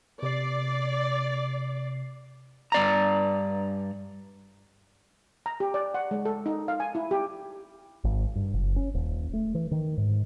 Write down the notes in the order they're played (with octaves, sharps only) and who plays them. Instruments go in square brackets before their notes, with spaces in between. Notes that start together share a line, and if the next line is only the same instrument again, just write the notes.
[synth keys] C3 C7 [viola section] D5
[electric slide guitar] G2 D5 A#5
[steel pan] A#5
G4
D5
F#5
G#3
A4
D#4
F5
G#5
E4
G4
[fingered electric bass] G#1
G2
F#1
C#4
D#1
A3
E3
D#3
G#2